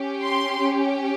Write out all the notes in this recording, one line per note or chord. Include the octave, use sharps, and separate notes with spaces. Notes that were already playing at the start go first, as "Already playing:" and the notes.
Already playing: C#4 G4
C6